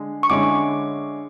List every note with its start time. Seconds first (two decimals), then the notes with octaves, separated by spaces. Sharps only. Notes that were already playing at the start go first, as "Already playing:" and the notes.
Already playing: D3 G#3
0.23 C#6
0.30 D3 G#3 C#4 E4 D6